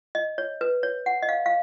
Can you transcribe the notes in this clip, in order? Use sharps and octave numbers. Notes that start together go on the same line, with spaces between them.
D#5
C#5
B4
C#5
F#5
D#5
F5
F5